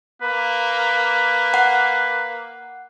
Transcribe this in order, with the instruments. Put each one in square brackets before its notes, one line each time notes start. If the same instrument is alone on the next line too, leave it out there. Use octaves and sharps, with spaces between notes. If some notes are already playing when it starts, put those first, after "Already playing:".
[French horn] A#3 [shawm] B4
[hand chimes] F#5